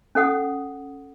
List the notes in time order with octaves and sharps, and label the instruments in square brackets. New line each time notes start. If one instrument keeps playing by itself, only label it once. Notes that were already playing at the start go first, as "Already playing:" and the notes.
[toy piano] C#4 A4 F#5 D#6